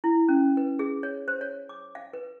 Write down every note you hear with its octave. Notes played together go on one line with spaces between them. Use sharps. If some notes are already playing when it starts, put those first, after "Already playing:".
E4
C#4
B4
G#4
C#5
C5
C#5
D6
F5
B4